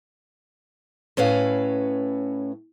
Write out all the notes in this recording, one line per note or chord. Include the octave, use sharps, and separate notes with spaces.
A2 C#4 B4 F5